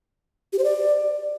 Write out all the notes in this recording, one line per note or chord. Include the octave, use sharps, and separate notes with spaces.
G4
C5
D5